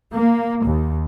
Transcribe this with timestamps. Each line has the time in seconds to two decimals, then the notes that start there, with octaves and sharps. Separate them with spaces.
0.14 A#3
0.66 D#2